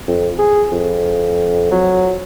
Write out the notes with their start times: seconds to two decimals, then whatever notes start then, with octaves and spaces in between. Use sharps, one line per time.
0.08 F2
0.38 G#4
0.72 F2
1.71 F#3